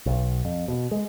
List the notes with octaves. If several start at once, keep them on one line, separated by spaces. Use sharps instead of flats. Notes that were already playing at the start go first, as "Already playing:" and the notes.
B1
F2
B2
G#3